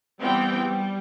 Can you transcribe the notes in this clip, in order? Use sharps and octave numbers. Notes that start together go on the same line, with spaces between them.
E3 G3 B3 C4 G5
G3